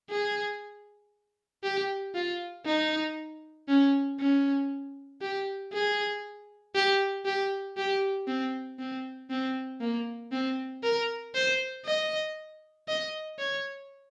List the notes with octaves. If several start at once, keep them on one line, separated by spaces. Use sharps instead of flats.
G#4
G4
F4
D#4
C#4
C#4
G4
G#4
G4
G4
G4
C4
C4
C4
A#3
C4
A#4
C5
D#5
D#5
C#5